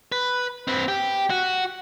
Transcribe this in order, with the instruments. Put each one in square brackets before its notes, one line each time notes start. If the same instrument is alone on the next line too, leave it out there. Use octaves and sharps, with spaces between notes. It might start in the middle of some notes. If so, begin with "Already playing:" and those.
[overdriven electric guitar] B4
C4 B4
G4
F#4